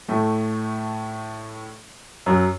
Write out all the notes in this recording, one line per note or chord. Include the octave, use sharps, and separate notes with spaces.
A2 A3
F#2 F#3